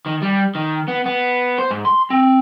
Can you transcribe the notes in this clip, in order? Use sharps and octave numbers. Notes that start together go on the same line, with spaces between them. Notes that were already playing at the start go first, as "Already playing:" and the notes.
D#3
G3
D#3
B3
B3
C5
G#2
C6
C4